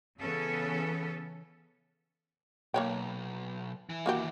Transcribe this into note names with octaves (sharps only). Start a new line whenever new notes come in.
C#3 E3 B3 C#4 A4
B1 A#3 C#5 G5
E3
D#2 E3 A#3 F#4 G4